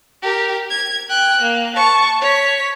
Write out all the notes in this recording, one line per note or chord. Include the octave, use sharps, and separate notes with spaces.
G4 A#4
G#6
G5 F#6
A#3
A5 C#6
C#5 B6